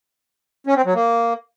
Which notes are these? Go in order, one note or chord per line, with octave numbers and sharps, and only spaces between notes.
C#4
C4
F#3
A#3